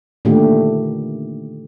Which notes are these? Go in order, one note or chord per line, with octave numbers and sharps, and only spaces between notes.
A#2 D3 D#3 A3 G4